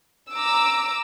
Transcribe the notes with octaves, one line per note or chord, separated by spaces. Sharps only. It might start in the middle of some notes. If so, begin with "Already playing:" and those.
A#5 D6 E6